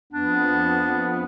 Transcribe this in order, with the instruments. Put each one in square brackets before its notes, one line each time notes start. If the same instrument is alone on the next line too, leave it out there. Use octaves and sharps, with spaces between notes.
[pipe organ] F2 B3 [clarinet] D4